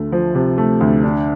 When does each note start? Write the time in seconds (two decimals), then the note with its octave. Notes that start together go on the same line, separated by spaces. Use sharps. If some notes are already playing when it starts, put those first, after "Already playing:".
Already playing: D2 A3
0.12 F3
0.35 C3
0.58 A3
0.81 D2
1.04 D4